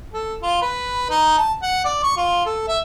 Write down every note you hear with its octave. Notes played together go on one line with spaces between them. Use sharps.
A4
F4
B4
D#4
A5
F#5
D5
C#6
F4
A4
E5